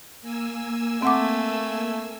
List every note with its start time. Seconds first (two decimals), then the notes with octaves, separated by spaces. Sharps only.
0.22 A#3 G#5 E6
1.02 A3 C4 F#5 D6